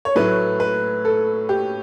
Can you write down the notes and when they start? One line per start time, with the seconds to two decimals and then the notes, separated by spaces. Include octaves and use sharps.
0.05 C#5
0.15 A2 F#3 A3 B4
0.60 B4
1.05 A4
1.49 G4